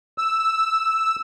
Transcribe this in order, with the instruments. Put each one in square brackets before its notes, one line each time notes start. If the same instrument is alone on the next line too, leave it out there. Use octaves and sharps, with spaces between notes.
[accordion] E6